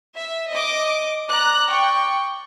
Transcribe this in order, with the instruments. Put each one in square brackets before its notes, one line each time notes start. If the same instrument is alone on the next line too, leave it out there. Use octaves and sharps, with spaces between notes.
[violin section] E5
D#5 D6
[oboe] D5 [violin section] A#5 F#6
[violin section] G5 C#6